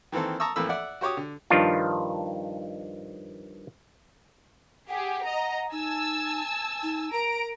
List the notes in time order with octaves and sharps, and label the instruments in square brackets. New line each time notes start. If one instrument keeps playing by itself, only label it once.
[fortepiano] D#3 E3 A#3 C4 A4
A5 A#5 C#6 D#6 E6
F2 A2 E3 A#3 B5 E6
D5 E5 F#5
F#4 G4 C#5 D6 D#6
D3
[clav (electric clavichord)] G2 D#3 F3 D4 F4
[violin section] G4 G#4 [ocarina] F#5
[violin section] D#5 A#5
[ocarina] D#4 [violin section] G#5 A5 E6
[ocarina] D#4
[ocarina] A#4 [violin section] A#5 D7